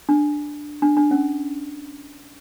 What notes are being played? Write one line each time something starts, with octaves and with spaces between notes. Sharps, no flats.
D4
D4
D4
C#4